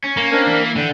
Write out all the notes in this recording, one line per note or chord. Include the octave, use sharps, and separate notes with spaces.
C#4
A#3
C4 D4 A#4
E3
D3 G5